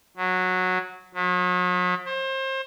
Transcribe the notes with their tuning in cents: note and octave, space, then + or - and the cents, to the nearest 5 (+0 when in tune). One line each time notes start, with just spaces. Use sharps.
F#3 -10
F#3 -40
C5 +30